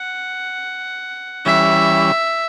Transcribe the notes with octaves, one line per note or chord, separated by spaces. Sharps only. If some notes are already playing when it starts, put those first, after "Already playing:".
Already playing: F#5
E3 G3 C#4 E5